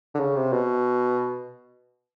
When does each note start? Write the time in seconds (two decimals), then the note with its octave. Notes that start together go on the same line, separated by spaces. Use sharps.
0.15 D3
0.20 C#3
0.36 C3
0.53 B2